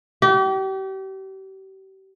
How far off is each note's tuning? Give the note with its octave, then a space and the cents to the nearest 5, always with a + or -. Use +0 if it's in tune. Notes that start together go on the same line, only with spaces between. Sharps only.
G4 -35